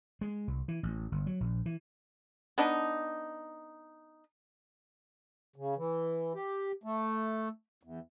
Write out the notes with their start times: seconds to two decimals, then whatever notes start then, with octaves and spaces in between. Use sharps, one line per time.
0.21 G#3
0.47 C2
0.68 E3
0.83 A1
1.12 G1
1.27 F#3
1.40 A#1
1.66 E3
2.58 B3 D4 D#4
5.56 C#3
5.76 E3
6.34 G4
6.83 A3
7.83 E2